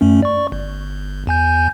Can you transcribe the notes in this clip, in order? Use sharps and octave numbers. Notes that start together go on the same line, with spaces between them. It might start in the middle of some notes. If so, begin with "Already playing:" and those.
F#2 A3 C#4
D5 C#6
G1
E2 G#5 G6